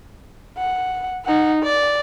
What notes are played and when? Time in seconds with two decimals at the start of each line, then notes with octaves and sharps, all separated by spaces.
0.57 F#5
1.25 D#4 F#5
1.63 D5